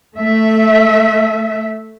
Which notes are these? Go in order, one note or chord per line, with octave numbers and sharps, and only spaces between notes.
A3 E5